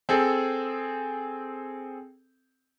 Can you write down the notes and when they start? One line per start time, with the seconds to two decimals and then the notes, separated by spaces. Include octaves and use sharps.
0.09 C4 G#4 A4